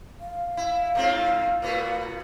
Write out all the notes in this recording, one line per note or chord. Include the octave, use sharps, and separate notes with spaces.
F5
E4
G#2 C4 F4
A2 B3 F#4